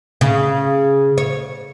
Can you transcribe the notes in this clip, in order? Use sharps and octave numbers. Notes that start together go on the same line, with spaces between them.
C#3
C#5